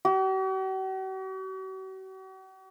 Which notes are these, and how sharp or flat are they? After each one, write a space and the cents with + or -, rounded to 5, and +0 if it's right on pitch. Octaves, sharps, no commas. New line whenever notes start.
F#4 +45